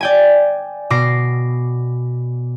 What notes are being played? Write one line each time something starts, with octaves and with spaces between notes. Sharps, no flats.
D5 G5 G#5
B2 D6 A#6 C7